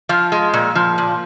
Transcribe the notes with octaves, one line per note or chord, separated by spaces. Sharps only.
F3 F4
G#3
A#2
F3
A#2